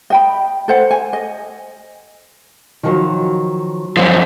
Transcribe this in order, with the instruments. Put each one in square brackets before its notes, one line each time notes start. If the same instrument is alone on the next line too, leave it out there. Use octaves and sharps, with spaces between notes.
[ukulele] D#5 G5 B5
A4 C5 F#5
G#5
D#5
[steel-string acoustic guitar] D#3 F3 F#3
[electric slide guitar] F#2 F3 [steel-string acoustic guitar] C5